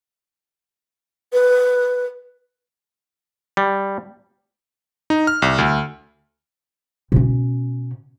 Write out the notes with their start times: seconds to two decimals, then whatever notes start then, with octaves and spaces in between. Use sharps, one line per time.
1.33 B4
3.57 G3
5.10 D#4
5.27 F6
5.42 C2
5.58 D2
7.12 B2 C#4